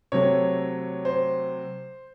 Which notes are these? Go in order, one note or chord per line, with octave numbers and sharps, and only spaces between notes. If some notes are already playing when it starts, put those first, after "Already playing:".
C3 F#3 A3 C#5
C5